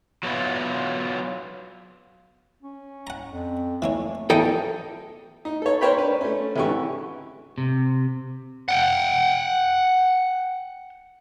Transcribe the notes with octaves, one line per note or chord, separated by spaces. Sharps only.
F#3 A3 B3 C#4 E4 F4
C#4
F#5 A#5
F2
E3 A3 A#3 C#5
E2 E3 F3 A4 D#5 G5
D#4
A4 C#5
A#4 C5 C#5 G5 B5
D4 B4
A3 C#4
G#1 D3 E3 G4 C#6
C3
F#5 G5